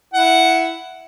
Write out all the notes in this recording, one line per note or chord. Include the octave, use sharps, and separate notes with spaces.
E4 F#5